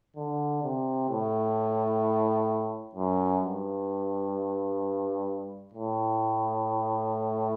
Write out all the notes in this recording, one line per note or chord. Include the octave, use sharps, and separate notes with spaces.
D3
C3
A2
F#2
G2
A2